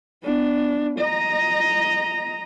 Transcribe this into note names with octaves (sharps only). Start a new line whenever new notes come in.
B3 D4
D#5 A#5